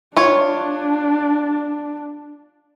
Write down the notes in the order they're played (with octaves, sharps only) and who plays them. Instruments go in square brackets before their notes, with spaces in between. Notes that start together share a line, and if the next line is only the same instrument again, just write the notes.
[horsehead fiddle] D4 [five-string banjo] F4 C#5